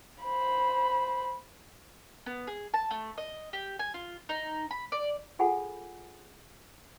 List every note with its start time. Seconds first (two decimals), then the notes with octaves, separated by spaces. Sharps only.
0.23 C5 B5
2.26 B3
2.47 G#4
2.74 A5
2.91 A3
3.18 D#5
3.53 G4
3.79 G#5
3.94 F4
4.29 D#4
4.71 B5
4.92 D5
5.39 F4 G#4 A4 F#5 G#5 B5